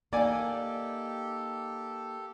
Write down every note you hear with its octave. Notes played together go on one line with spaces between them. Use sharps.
A#3 D#4 G4 A4 D5 G#5